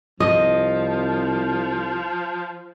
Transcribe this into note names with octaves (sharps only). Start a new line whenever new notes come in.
C2 F3 D#5